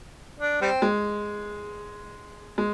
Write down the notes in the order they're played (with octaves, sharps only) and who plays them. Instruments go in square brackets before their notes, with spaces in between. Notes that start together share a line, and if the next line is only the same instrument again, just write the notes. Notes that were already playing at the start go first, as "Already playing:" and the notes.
[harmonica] D4
G3 C4
[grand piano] G#3
G#3